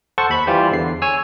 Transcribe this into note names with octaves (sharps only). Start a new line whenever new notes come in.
A4 C5 F#5 A5 C#6
D#2 B5 C#6
E3 G3 F4 G4 C5
E2 D3 C7
C#5 G#5 E6